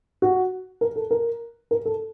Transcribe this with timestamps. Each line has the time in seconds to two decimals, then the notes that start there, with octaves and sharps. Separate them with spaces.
0.22 F#4
0.81 A#4
0.96 A4
1.11 A#4
1.71 A#4
1.85 A4